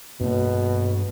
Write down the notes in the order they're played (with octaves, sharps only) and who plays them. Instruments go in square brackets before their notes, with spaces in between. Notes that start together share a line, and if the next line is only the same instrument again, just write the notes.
[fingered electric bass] G2 A#3 [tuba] B2